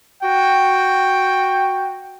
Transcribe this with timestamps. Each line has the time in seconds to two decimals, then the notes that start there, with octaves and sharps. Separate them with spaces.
0.23 F#4 G5